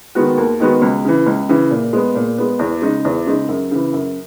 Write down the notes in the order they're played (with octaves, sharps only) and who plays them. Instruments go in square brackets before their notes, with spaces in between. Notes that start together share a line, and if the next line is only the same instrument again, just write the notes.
[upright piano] D#3 G#3 B3 F#4
D#2
D#3 G#3 B3 F#4
C#2
C#3 E3
C#2
C#3 E3
A#2
G#3 B3
A#2
G#3 B3
E2
C#3 G#3 D#4
E2
C#3 G#3 D#4
F#2
C#3 E3
F#2